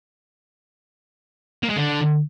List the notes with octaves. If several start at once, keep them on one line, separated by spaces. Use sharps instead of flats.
A#3
G#3
D3